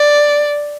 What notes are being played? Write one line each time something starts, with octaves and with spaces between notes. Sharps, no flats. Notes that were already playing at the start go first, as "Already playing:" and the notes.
Already playing: D5